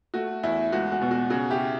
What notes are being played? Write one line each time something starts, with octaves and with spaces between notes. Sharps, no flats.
A3 F#4
E2 E4
C#2 F#4
F#4
B2
F#4
C#3 F#4
E4 G4